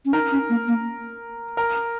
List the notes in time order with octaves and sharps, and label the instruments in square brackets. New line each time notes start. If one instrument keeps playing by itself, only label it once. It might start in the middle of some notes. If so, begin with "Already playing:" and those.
[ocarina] C#4
[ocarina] D#4 [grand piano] A#4
[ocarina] C#4
A#3
A#3
[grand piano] A#4